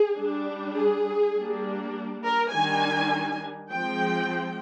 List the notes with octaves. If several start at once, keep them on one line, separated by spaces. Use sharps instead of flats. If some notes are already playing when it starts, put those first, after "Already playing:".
Already playing: G#4
G3 D4
G#4
G3 A#3 D4
A#4
D#3 G3 D4 G#5
F3 G#3 C4 G5